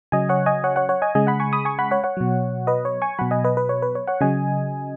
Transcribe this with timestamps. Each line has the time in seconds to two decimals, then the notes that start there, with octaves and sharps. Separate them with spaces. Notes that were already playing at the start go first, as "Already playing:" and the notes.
0.12 C#3 F#3 D#5 G#5
0.29 C#5 F#5
0.46 D#5 G#5
0.64 C#5 F#5
0.76 C#5 F#5
0.89 C#5 F#5
1.02 D#5 G#5
1.15 C#3 G#3 D#5 G#5
1.27 F#5 B5
1.40 G#5 C#6
1.53 B5 D#6
1.65 G#5 C#6
1.79 F#5 B5
1.91 C#5 F#5
2.04 C#5 F#5
2.17 B2 F#3
2.67 B4 D#5
2.85 C#5
3.02 G#5 C#6
3.19 B2 F#3 F#5 B5
3.31 D#5 G#5
3.45 B4 D#5
3.57 B4
3.69 C#5
3.82 B4
3.95 C#5
4.07 C#5 F#5
4.21 C#3 F#3 D#5 G#5